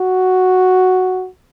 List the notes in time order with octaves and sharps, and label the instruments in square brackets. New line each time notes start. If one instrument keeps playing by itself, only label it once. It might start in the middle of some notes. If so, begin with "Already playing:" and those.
Already playing: [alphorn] F#4